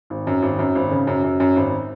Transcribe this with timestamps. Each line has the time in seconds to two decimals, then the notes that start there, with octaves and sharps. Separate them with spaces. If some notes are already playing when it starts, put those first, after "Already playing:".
0.10 G#1
0.27 F#2
0.42 G#1
0.59 F#2
0.75 G#1
0.91 C#3
1.07 F#2
1.24 F#2
1.40 F#2
1.56 G#1